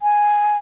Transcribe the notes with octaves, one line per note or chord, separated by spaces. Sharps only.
G#5